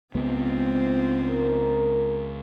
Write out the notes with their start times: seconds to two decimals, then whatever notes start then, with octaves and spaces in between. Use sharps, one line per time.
0.15 C#2 G#3 B3 C4 F4 C5
1.26 A#4